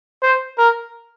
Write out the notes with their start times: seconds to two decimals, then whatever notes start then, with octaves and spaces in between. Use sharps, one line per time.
0.22 C5
0.58 A#4